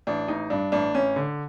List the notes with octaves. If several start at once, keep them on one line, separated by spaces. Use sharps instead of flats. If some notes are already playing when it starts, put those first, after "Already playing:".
A1 D4
A1 D#4
G2 D4
A1 D4
A1 C#4
D3